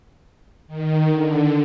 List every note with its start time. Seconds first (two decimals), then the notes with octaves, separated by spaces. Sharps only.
0.67 D#3
1.11 D3